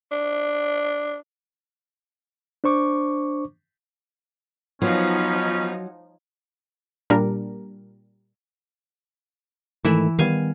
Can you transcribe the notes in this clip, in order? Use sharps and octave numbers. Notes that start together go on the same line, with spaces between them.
D4
D4 C5 C#6 D6
F3 F#3 B3 C#4 D#4 F4
A#2 G3 D4 A#4
G#2 D#3 E3 A3 E4
D#3 G3 B3 F5 G#5